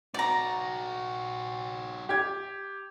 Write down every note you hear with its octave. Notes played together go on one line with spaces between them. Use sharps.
D#4 F#4 D5 A#5
G4 G#6